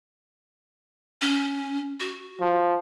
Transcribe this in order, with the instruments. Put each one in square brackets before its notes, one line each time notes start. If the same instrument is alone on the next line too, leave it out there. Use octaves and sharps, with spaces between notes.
[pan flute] C#4
F#4
[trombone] F3